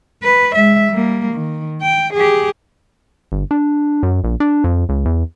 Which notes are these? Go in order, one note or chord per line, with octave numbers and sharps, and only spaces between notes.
B4
G#3 E5
G3 A#3
D#3
G5
G4 G#4
G1
D4
F#2
A#1
D4
F2
C#2
E2